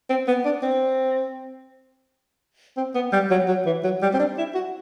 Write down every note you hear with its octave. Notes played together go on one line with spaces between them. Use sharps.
C4
B3
D4
C4
C4
B3
G3
F#3
F#3
E3
F#3
G3
C4
D4
E4
F#4